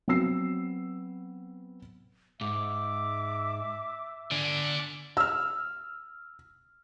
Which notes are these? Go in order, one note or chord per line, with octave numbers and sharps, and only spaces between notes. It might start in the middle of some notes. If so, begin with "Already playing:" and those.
F#3 B3 C4 E6 C7
G#2 E5 D6
D3 D5 G#5
E6 F6